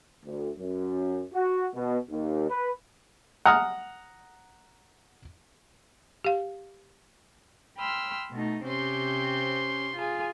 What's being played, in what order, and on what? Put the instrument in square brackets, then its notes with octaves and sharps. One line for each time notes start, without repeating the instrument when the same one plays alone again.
[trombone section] D2
F#2
F#4
B2
D#2
B4
[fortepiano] F#5 A#5 D#6 F6
[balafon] G4 F5
[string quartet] G5 B5 C6 E6 F6
B2 A3 D#4
C3 C4 C#4 G4 C6 G6
F4 G#4 G#5